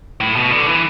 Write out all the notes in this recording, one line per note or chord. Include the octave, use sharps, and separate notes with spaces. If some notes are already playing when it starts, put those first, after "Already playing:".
A2
B2
D3
E3